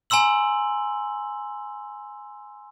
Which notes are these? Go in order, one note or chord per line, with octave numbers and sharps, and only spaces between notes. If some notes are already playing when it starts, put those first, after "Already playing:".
G#5 A#5 C6 E6 F#7